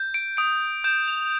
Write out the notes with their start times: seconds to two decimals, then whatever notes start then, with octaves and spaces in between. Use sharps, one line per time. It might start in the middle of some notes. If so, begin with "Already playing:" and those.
Already playing: G6
0.14 D7
0.37 D#6 D7
0.84 G6 E7
1.08 F7